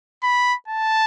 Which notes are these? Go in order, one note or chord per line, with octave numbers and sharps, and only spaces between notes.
B5
A5